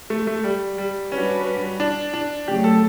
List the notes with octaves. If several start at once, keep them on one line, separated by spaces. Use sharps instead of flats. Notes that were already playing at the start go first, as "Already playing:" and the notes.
A3
A3
G3
G3
G3 C#4 D4 F#4 B4
D4
D4
C#3 F#3 A3 G4
A4